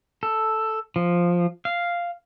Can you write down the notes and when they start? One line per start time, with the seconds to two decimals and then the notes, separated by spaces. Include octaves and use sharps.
0.23 A4
0.96 F3
1.65 F5